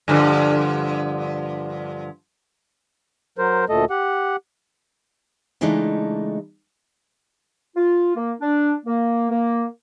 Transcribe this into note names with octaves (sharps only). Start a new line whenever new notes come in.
G2 D3 F3
F#3 A#4 C5
D2 A#2 A3 A4 D#5
G4 F#5
C#3 E3 G#3 A3 D4 D#4
F4
A#3
D4
A#3
A#3